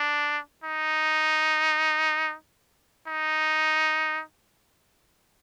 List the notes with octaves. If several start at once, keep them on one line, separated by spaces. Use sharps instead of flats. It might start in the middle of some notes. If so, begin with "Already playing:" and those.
Already playing: D4
D#4
D#4